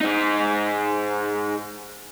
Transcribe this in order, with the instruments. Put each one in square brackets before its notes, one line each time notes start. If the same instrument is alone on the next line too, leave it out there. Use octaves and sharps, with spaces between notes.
[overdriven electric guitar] G#2 D#4